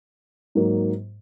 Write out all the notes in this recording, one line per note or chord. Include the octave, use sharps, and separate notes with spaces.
G#2 F#3 A#3